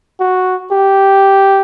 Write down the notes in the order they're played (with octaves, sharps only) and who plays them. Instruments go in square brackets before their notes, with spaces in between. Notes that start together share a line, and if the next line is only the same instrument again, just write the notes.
[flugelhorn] F#4
G4